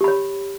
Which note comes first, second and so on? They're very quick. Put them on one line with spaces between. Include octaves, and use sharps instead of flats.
G4 B5 C#5